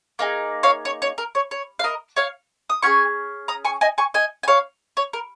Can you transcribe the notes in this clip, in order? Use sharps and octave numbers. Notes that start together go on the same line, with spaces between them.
A#3 D#4 G#4
C#5 F5
C#5
C#5
A#4
C#5
C#5
F5
A#4 D#5
C#5 F5
D#6
C#4 F4 G#4 G#5 C#6
A#5 D#6
G#5 C#6
D#5 G#5
G#5 C#6
D#5 G#5
G#5
C#5 F5
C#5
A#4